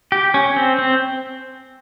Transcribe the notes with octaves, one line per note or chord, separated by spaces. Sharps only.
G4
C#4
C4
C4